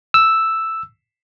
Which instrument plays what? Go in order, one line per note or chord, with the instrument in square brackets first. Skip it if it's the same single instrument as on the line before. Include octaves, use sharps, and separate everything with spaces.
[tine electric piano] E6